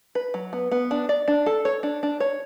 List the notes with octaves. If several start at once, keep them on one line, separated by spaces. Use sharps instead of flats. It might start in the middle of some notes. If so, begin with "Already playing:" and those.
B4
F#3
B3
B3
D4
D5
D4
A4
C#5
D4
D4
C#5